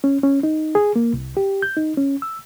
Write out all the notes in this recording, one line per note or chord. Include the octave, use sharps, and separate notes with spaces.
C#4
C#4
D#4
G#4
A#3
C2
G4
G6
D#4
C#4
E6